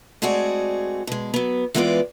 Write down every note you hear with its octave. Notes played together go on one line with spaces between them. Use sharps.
G#3 A3 C4 F#4 G#4 D5
B2 G#3
F#3 B3
E3 G#3 B3 F4 A#4 D5